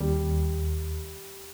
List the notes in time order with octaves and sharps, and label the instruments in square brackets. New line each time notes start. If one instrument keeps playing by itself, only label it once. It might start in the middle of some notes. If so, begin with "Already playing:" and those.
[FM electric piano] D#2 [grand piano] G3